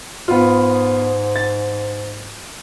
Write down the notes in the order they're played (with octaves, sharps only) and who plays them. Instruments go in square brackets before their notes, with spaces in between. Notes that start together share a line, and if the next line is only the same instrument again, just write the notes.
[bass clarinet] G#2 [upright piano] B3 F4
[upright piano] A6